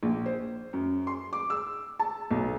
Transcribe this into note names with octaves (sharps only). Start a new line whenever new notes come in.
A#1
C5
F#2
C6
D6
E6
A5
B1